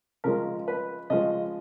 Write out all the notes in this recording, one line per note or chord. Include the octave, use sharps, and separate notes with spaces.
C#3 F3 G#3 A#4
B4
C#3 F3 G#3 D#5